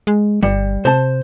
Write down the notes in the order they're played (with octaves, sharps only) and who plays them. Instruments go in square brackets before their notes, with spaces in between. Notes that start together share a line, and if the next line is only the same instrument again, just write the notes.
[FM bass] G#3
[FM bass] G1 [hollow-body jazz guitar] G3
[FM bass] C3 [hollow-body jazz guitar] C5 A5